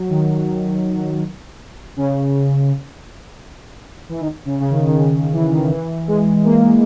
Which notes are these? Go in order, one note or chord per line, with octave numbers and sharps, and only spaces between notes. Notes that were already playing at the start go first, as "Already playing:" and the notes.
Already playing: F#3
D#3
C#3
E3
D#3
C#3
C#3
D#3
D#3
C#3
D#3
E3
D#3
E3
G#3
A#3